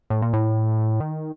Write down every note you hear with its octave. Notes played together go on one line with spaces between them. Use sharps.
A2
A#2
A2
D#3